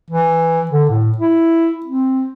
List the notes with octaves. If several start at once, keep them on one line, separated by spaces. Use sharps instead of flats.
E3
D3
A2
E4
C4